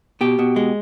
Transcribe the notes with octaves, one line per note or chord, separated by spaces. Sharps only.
B2 G4
B2
G#3